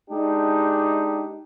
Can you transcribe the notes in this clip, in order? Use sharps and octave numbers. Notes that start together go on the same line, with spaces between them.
G#3 D4 D#4 G4